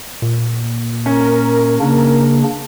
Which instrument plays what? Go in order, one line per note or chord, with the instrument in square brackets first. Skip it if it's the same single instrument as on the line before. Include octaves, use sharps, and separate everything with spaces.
[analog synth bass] A#2
[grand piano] C#4 [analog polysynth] A#4
[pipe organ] C#3 A#3 D4